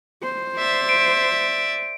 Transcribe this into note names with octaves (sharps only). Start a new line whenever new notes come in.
C5
D5 E5
D7